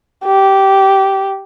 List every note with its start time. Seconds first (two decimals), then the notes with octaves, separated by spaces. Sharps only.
0.25 G4